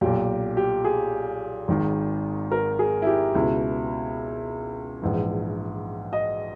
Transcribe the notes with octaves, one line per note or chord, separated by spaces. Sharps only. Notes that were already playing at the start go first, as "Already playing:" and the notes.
B1 A#2 G4
G4
G#4
G#1 G#2 D#3
A#4
G#4
E4
G4
C#2 B2 E4
A#1 G#2 E3
D#5